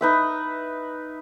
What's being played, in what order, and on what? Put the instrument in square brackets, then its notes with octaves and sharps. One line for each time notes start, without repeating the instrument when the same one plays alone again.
[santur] D#4 B4 E5